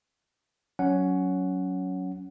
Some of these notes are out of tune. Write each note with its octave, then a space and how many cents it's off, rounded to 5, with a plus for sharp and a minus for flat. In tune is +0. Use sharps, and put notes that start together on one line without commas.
F#3 +0 C#4 +10 F#5 +0